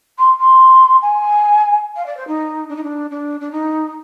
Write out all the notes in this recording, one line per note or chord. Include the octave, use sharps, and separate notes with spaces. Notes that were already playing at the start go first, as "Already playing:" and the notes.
C6
C6
G#5
F5
D5
C5
D#4
D4
D#4
D4
D4
D4
D#4